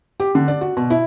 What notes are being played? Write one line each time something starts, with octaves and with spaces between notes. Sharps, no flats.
G4
D3
D5
F#4
B2
E4